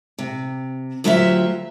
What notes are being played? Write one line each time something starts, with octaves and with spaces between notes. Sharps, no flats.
C3
D2 F#3 E4 F4 G4 E5